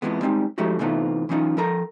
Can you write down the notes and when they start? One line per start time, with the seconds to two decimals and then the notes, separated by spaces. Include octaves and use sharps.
0.02 F2 G#2 E3 F3 G#3 B3
0.21 G3 G#3 C4 D4 D#4
0.58 F3 G#3 A3 D#4 F#4 G4
0.79 C3 E3 A3 B3 D#4 F4
1.29 E3 F#3 C#4 D#4 F4
1.57 F3 A4 A#4 A#5